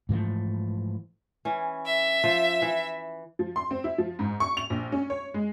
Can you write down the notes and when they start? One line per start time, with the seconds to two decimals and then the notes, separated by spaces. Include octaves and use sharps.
0.09 G#2 E3 F3 A3
1.45 E3 C#4
1.86 E5
2.24 F3
2.62 E3
3.39 F3
3.56 C6
3.71 C4
3.84 E4
3.98 F3
4.19 G#2
4.40 C#6
4.57 F7
4.70 A#1
4.92 C#4
5.10 C#5
5.34 G#3